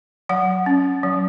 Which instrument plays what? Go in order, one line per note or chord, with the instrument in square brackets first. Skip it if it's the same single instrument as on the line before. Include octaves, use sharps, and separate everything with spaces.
[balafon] F#3 F#5
C#4
F#3